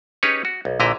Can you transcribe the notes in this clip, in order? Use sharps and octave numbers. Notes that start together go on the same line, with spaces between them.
C#4 D#4 G4 G#4 B4 C#5
F#4
B1
A#1 A#2 D3 E4 D#5 A#5